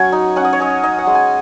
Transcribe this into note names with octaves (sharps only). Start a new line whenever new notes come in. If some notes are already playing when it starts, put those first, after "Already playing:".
Already playing: F#3 C#4 F#5 G#5
D#4
C#4 F#5
D#5
C#5
C#4 D#5
D#4 D#5
F#5
G#3
G#5